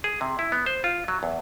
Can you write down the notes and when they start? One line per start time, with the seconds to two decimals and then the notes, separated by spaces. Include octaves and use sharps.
0.04 G#4
0.21 C3
0.39 E4
0.52 B3
0.66 C5
0.84 F4
1.08 F#3
1.23 E2